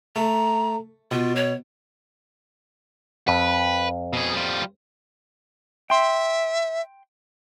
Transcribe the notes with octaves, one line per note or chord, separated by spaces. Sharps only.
A3 A#5
B2 F4
C#5
F2 B4
B2 G#4
G3 F4
E5 G5 C6